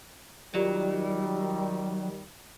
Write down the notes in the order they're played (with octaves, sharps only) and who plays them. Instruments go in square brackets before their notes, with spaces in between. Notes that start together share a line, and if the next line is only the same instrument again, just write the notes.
[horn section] D#3 G3 [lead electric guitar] F#3 [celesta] F4 G4 D5